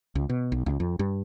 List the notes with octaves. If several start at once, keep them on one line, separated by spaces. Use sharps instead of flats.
C#2
B2
B1
C#2
F2
G2